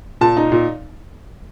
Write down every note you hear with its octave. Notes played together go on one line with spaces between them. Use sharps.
A#2 A5
D#4
A#2